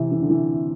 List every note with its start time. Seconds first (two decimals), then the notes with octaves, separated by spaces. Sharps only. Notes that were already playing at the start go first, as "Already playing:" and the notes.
Already playing: C3 E3
0.12 E3
0.21 D3
0.30 E3